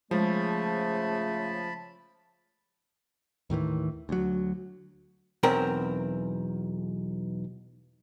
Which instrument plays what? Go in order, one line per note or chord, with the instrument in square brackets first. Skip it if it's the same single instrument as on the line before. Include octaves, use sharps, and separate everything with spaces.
[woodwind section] C#3 A3 [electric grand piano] F3 [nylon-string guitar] G#3 [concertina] A5 B5
[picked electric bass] D#2 A2 D#3 E3
D2 F#3
[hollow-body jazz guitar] B1 E2 C4 A#4